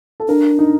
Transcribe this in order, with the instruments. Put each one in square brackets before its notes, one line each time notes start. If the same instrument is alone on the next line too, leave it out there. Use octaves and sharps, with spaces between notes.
[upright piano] A4
[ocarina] D4 [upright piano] A#4
[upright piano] D#4